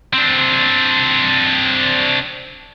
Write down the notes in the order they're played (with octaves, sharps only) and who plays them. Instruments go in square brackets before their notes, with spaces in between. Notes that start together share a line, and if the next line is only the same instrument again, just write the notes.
[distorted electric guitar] C4 D4